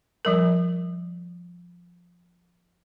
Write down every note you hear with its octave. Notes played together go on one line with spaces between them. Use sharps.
F3 G3 A#4